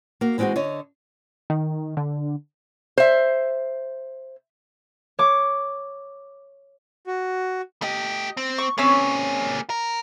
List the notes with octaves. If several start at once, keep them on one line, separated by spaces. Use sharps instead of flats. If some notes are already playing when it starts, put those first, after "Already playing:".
A#3 F#4
E3 G#3 C4 F4 F#4 G#4
D3 C#5 D#5
D#3
D3
C5 E5
C#5 D6
F#4
A3 G4 D#5
C4
C#6
A#3 C4 C#4 G#4 C#5
A#4